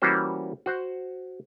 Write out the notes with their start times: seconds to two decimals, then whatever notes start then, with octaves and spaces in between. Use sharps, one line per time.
0.02 E3 G3 A#3 C#4 F#4 C5
0.66 F#4 C5 F#5